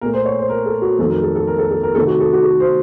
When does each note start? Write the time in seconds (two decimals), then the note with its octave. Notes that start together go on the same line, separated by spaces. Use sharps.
0.01 A#2 A3 A#4
0.13 C5
0.26 C#5
0.39 C5
0.49 A#4
0.66 A4
0.82 F#4
0.99 F2 D#3 F#3 A3 A4
1.10 A#4
1.23 A4
1.35 A4
1.47 A#4
1.59 A4
1.71 A4
1.83 A#4
1.95 C3 D#3 A3 A4
2.07 F#4
2.20 A4
2.32 F#4
2.44 A4
2.60 C5